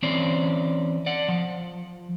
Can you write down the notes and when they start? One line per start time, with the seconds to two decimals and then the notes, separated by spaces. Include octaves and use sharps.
0.02 E3 C4 C#4 C5 D5
1.06 D5 F#5
1.29 F3